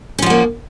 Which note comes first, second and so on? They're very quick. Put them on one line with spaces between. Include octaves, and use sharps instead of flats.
C#4 F3 F#4 A#3